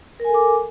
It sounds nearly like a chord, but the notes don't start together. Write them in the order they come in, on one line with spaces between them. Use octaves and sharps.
A#4 G#5 A4 D6